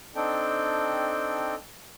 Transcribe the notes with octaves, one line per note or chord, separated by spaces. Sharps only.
C4 D4 D#4 A4 G5